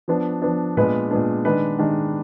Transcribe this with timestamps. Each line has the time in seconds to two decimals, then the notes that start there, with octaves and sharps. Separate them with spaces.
0.08 F3 B3 D4
0.42 F3 B3 D4
0.77 A#2 G#3 B3 D4 B4
1.11 A#2 G#3 B3 D4
1.45 D#3 G#3 D4 B4
1.79 D#3 G#3 D4